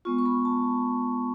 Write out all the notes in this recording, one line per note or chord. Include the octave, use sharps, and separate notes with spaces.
G#3 B3 F4 C#6
C#6
B5
A5